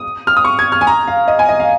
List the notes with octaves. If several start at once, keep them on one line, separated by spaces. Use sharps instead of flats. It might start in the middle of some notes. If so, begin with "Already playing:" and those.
Already playing: D#6
F6
D#6
C#6
G#6
F6
G#5
A#5
F5
D#5
G#5
D#5
F5